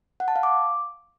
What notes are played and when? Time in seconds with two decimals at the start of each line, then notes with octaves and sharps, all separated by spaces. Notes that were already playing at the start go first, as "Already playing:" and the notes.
0.20 F#5
0.28 A5
0.36 F5
0.43 D6